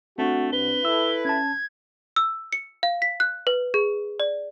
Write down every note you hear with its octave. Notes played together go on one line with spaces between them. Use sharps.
A3 C4 D4 F#4
C2 B4 G7
E4 A4 E6
C#4 A5 G#6
E6
C#7
F5
B6
F#6
B4
G#4
D5